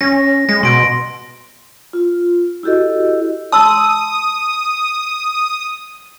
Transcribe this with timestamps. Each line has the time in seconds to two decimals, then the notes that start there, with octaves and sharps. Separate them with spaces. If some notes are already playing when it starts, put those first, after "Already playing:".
0.01 C#4 A#6
0.49 G#3 A#6
0.63 B2 C6 D7
1.93 F4
2.63 E4 F#4 G4 A4 D#5
3.52 A5 C6 D#6 E6